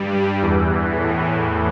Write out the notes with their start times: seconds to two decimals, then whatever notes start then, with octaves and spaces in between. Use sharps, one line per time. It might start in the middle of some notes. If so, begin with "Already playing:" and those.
Already playing: G2 G3
0.42 E2 E3
0.93 A2